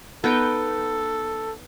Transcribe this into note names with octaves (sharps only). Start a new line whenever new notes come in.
B3 D#4 A4 G5